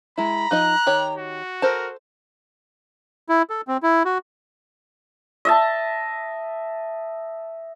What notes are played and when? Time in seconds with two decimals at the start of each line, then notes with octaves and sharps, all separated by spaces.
0.18 G#3 E4 A#5 B5
0.51 F3 D#4 D#5 F#6
0.87 D#3 G4 C#5
1.18 F#4
1.62 A4 A#4 C5 A5
3.29 E4
3.50 A4
3.68 C4
3.83 E4
4.05 F#4
5.45 D#5 E5 A5